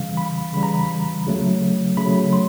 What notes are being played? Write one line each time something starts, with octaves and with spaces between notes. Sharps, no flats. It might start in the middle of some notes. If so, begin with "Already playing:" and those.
Already playing: C#3 E3 G3 F5
B5
C#3 E3 G3 B5
A#5
B5
C#3 F#3 A3
C#3 F#3 A3 B5
C6